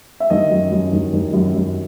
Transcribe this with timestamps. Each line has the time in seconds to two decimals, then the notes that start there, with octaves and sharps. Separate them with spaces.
0.20 E5
0.30 D#3 D#5
0.51 F#2
0.72 F#2
0.92 D#3
1.13 D#3
1.33 F#2
1.54 F#2